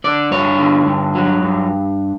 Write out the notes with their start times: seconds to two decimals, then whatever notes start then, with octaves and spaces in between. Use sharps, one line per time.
0.04 D3 D5
0.31 G2 C#5
0.59 D3
0.87 G2
1.15 F#3
1.43 G2